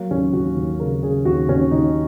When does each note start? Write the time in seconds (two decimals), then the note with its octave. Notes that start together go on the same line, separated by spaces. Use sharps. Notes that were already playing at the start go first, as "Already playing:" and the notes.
Already playing: F#3 A#3
0.10 D#2 C#4
0.33 D#2 F#4
0.56 D#2
0.80 C#3 A#4
1.03 C#3 G#4
1.25 D#2 F#4
1.49 D#2 C#4
1.71 D#2 D#4